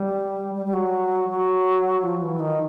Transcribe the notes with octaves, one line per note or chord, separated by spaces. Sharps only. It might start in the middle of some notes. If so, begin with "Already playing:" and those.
Already playing: G3
G3
G3
F#3
F#3
F3
E3
D#3